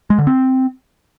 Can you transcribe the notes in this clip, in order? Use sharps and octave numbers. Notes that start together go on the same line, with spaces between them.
G#3
D3
C4